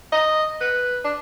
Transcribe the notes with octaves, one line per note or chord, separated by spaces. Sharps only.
D#5
B4
D4